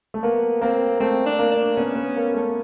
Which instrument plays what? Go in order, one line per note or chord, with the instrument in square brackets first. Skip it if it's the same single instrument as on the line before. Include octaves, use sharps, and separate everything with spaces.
[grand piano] A3
[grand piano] A#3 [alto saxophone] B3
[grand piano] A#3 [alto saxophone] C4
[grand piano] A3 [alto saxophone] C4
[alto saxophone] D4
[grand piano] A#3
[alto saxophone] D4
[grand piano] B3 [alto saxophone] C#4
[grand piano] B3
A#3
A3